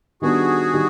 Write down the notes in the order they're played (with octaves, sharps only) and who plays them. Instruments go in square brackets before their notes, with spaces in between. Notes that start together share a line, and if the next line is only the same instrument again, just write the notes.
[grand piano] D#3 G3 B3 D4 [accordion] F#4 G#4
[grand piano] D#3 G3